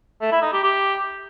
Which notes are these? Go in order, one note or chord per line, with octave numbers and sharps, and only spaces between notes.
A3
E4
D#4
G4
G4